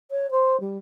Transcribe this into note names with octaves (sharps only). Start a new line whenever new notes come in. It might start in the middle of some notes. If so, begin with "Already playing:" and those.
C#5
C5
G3